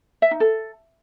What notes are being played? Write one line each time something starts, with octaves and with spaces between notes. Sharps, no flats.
E5
D#4
A4